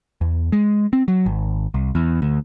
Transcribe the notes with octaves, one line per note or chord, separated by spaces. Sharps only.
E2
G#3
C4
F#3
G#1
C2
E2
D2